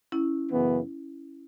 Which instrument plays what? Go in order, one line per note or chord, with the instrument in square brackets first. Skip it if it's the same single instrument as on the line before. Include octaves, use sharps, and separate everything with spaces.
[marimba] C#4 E4
[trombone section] F#2 C#3 E3 B3